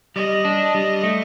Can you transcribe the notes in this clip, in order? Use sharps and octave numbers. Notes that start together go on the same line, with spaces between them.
G3 D#5
D4
G3
A3